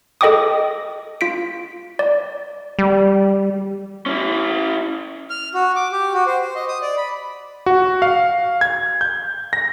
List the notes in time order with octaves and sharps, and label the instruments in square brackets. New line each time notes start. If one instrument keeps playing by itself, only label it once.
[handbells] G#4 A4 D#5 G5 D6 D#6
F4 B6 D7
D5
[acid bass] G3
[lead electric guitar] C#4 E4
[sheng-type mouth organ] F6
F#4
D6
G4
F#4
C5
C5
D#5
D#6
D5
B5
[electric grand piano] F#4
F5
G#6
G6
A#6